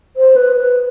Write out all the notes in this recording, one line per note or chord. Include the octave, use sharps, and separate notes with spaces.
C5
B4
B4